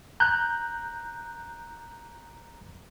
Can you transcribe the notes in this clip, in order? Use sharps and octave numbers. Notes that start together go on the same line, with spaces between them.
A#5 F#6 G6